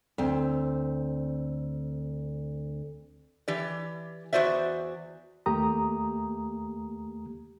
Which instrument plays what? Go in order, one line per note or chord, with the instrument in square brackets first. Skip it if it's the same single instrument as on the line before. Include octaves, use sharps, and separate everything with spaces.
[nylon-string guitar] D2 C4
[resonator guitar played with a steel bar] E3 G4 D5
E2 F#4 C5 D5 E5
[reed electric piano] D#2 A3 A#3 G4 A#5 D#6